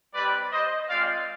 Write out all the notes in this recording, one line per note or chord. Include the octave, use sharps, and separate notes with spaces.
G3 C4 G4 B4 D5
C5 D#5
G#3 C4 F4 D5 F5